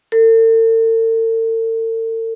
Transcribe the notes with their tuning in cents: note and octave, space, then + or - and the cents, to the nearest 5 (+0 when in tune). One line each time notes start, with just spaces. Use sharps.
A4 +45